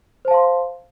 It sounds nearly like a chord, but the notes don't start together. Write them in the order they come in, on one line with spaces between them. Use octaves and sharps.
C5 A5 F5 C6